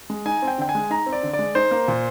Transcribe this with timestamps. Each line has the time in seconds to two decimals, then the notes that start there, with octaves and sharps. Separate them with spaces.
0.10 G#3
0.26 D#4 G#5
0.42 C4
0.48 G5
0.58 D3 G5
0.69 G#5
0.75 G#3
0.90 D#4 A#5
1.06 C4
1.13 D5
1.23 D3
1.33 D5
1.39 G#3
1.55 D#4 C5
1.71 A#3
1.88 A#2